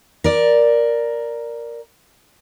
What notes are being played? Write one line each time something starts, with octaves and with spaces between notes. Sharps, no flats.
A#4 D5